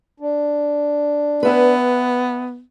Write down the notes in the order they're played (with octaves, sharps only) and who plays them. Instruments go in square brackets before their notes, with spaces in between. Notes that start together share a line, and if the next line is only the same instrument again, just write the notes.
[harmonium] D4
[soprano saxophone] B3 [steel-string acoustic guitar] B4 E5 G#5